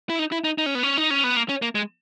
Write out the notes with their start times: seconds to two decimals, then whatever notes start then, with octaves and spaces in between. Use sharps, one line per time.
0.10 E4
0.19 D#4
0.32 E4
0.44 D#4
0.58 D#4
0.66 C#4
0.75 B3
0.83 C#4
0.98 D#4
1.10 C#4
1.24 B3
1.36 A#3
1.49 C#4
1.62 A#3
1.75 G#3